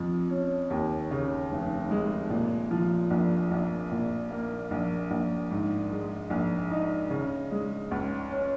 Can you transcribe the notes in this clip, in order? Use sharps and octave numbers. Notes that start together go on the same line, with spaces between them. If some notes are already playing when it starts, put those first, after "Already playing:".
Already playing: F2 F3
C#4
D#2
C#3
F1
G#3
A#2
F3
A#1
A#1
A#2
A#3
A#1
A#1
G#2
G#3
A#1
D#4
C#3
G#3
C#2
C#4